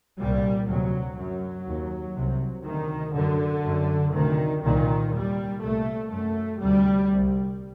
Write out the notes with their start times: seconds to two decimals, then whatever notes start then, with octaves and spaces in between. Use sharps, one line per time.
0.19 C2 A#2 G3
0.69 D2 C3 F#3
1.17 F#2 F#3
1.67 D#2
2.16 C2 C3
2.66 D2 C3 D#3
3.15 F#2 D3
3.65 F#2
4.14 D2 C3 D#3
4.64 C2 A#2 D#3
5.13 D#2 G3
5.62 C2 A#2 A3
6.11 F#2 A3
6.60 D2 C3 G3
7.11 C2 C3